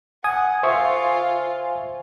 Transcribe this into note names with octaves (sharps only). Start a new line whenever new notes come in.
F#5 G#5 D#6
F4 C5 E5 F5 C#6